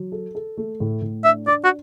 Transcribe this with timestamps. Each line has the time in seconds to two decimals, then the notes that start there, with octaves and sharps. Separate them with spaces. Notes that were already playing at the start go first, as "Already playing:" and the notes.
Already playing: F#3
0.12 A4
0.35 A4
0.57 A3
0.80 A2
1.02 A2
1.24 D4 E5
1.47 D4 D5
1.64 F#4